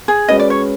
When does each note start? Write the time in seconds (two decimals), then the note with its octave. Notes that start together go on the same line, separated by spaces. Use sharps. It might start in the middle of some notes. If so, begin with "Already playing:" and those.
0.08 G#4
0.28 G#3 C#4 F#4 B4 D#5
0.39 D5
0.50 C#5